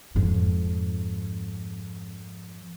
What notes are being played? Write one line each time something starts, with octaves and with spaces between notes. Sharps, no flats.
F2 G#2